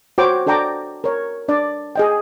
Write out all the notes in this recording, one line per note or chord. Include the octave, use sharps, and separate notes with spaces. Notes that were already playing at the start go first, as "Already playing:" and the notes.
F#4 C5 C#5 G5 D6
D4 A4 D5 G5 A#5 D6
A#4 C#5
D4 D5
G#4 D#5 G5